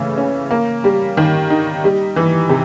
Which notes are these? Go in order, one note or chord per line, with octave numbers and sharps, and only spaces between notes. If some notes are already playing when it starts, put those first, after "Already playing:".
Already playing: C#3 E3 A3
C#4
A#3
G3
D#3
D#4
G3
E3
C3